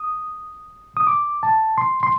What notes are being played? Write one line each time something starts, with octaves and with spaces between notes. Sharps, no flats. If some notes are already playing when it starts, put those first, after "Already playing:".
Already playing: D#6
D#6
D6
A5
C6
C6